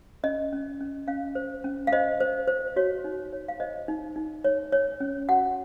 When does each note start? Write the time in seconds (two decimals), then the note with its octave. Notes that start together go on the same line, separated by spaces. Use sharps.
0.23 C#4 D#5
0.52 C#4
0.81 C#4
1.08 C#4 F5
1.35 C5
1.64 C#4
1.87 F5
1.92 C5 D#5
2.20 C5
2.48 C5
2.76 F#4 C#5
3.04 D#4
3.33 C#5
3.48 F5
3.60 C5 D#5
3.88 D#4
4.16 D#4
4.44 C#5
4.72 C#5
5.00 C#4
5.29 F#4 F#5